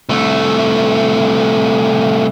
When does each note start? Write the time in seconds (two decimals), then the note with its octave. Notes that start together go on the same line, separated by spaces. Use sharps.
0.09 C2 A3